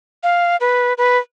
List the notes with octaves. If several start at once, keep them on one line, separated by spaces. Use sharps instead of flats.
F5
B4
B4